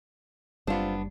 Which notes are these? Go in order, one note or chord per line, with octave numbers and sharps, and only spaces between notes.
F#1 G3 B3 C4 D4 F4